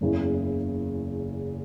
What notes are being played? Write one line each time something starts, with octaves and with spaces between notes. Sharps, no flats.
F#1 E2 C#3 E3